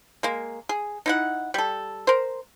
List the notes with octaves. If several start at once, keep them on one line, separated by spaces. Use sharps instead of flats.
G#3 A#3
G#4
D#4 E4 F#5
G3 A4
A#4 C5